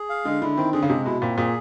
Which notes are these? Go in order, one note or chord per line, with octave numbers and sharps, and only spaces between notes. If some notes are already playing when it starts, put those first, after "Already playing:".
Already playing: G#4
F5
D3 G#3
D3 E4
D#3 C4
D3 G#4
C#3
C3 G#3
B2 E4
A#2 C4
A#2 G#4